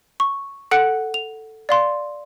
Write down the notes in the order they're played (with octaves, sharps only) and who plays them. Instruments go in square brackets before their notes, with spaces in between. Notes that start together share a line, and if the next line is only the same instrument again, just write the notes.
[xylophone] C#6
A4 F#5 F#6 C#7 D7
F7
D5 F5 C6